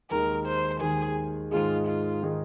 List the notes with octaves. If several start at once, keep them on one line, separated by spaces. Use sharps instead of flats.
D#2 D#3 G#3 A#4
C5
D#2 D#3 G#3 G#4
G#2 D#3 G#3 D#4 F4 G#4
F4
D#3 G#3 D#4 G#4